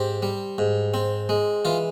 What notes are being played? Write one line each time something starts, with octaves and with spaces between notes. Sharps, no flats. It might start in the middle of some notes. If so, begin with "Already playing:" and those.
Already playing: G#2 C4 G4
G3
G#2
C4
G#3
E3 F4